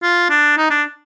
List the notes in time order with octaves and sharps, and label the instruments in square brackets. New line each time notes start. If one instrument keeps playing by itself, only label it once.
[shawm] F4
D4
D#4
D4